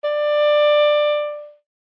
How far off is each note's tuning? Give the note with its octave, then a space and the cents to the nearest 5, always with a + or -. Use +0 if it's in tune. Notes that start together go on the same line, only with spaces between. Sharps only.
D5 +15